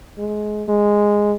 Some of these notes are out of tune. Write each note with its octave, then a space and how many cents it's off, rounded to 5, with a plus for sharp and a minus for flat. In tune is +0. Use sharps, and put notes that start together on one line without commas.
G#3 +20
G#3 -5